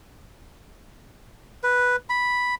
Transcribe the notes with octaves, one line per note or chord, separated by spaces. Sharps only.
B4
B5